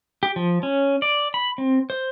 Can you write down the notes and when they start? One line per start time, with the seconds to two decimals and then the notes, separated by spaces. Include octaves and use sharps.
0.23 G4
0.36 F3
0.63 C#4
1.02 D5
1.34 B5
1.58 C4
1.90 C5